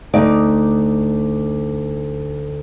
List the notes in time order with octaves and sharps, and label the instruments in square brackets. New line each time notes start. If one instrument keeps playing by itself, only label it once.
[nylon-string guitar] D2 D#4 D5